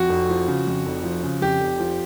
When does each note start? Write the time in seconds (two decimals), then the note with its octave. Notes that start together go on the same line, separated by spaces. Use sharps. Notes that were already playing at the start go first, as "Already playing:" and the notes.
Already playing: F2 F#4
0.09 F1
0.29 F3
0.48 C#3
0.67 F2
0.86 F1
1.04 F3
1.24 C#3
1.41 F2 G4
1.61 F1
1.80 F3